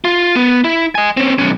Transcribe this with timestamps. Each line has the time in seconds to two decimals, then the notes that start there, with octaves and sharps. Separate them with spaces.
0.05 F4
0.36 B3
0.64 E4
0.95 D#5 G#5
1.17 C4 C#4
1.38 B1 C#4